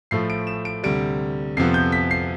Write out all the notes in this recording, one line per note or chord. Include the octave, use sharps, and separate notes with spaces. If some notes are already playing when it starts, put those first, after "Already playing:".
A2 F3 A3 C7
D7
E7
D7
D2 C3 G3 D7
F2 C3 F3 B3 C7
G6
B6
C7